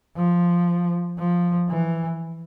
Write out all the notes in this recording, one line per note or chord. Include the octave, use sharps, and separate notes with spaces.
F3
F3
E3